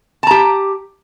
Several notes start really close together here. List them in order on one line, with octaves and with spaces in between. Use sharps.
A5 A#5 G4